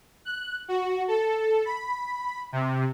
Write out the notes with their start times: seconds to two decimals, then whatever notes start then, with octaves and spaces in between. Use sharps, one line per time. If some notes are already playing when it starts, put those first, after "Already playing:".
0.25 F#6
0.68 F#4
1.08 A4
1.65 B5
2.52 C3